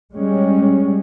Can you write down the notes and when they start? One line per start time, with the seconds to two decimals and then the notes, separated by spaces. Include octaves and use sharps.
0.14 G3 G#3 C#4